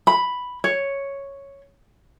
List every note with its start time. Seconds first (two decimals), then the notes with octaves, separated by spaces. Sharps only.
0.07 B5
0.64 C#5